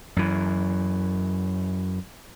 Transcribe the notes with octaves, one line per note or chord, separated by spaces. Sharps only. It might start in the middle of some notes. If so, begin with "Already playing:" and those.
F#2 E3